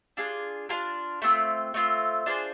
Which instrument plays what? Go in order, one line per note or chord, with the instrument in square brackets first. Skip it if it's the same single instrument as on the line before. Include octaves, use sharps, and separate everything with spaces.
[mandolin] D4 F4 G#4
D4 F4 G#4
A3 C4 F4
A3 C4 F4
D4 F4 G#4 C5